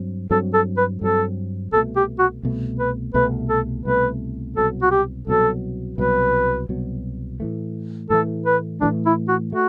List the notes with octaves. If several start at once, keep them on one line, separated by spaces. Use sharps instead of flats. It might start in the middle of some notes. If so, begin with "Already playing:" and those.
Already playing: G2 F#3 C4
G2 F#3 C4 A4
A4
B4
G2 F#3 C4 A4
C2 B2 A3 A4
G4
F#4
C2 B2 A3
B4
C2 B2 A3 B4
A4
C2 B2 A3 B4
C2 B2 F#3 A4
F#4
G4
C2 B2 F#3 A4
C2 B2 F#3 B4
C2 B2 F#3
A2 E3 A3
A2 E3 A3 A4
B4
A2 E3 A3 D4
E4
F#4
A3 F#4